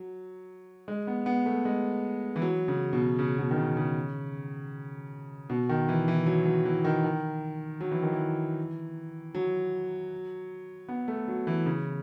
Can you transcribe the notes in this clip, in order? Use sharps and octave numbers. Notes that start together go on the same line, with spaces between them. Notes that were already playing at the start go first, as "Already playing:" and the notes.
Already playing: F#3
G#3
B3
B3
A3
G#3
E3
F#3
C#3
B2
C#3
B2
D#3
C#3
C#3
B2
D#3
E3
E3
F#3
F#3
E3
D#3
D#3
F#3
E3
D#3
E3
F#3
B3
A3
F#3
E3
C#3